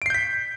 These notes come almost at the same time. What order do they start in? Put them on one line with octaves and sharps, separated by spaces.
D7 C7 G6 B6